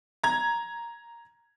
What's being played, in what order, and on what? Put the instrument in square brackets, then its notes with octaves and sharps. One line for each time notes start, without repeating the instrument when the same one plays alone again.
[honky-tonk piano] A#5 G#6